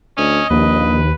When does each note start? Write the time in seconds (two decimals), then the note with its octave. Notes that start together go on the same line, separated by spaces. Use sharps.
0.18 D2 C#4 D#5
0.50 A#1 D#2 B4